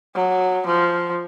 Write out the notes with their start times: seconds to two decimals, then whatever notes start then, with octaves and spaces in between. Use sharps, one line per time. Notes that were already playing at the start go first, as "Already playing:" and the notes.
0.15 F#3
0.66 F3